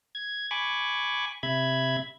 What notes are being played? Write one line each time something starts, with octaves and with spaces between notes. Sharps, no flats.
G#6
G#5 B5 C#6 D6
C3 E5 B5 G#6